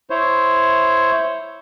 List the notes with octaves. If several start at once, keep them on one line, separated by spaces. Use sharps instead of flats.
E4 C5 C#5